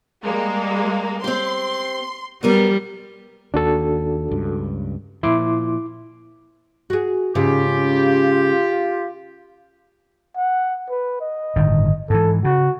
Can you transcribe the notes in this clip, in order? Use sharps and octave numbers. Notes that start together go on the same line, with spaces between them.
G3 G#3 A#3
C4 G4 C6
F#3 G3 B3 A#4
D#2 D4 F#4 A4
C#2 G2
A#2 F3 E4 C6 D6
F#4 G#4
G#2 C#3 F4 G4
F#5
B4
D#5
G1 A2 D#3
G#2 E3 A4
C#3 F#4